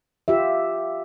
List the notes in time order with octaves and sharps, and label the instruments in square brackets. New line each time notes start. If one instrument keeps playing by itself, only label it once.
[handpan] F4 G4 E5